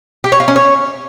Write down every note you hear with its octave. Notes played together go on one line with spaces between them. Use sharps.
G4
C#5
F4
C#4
C#5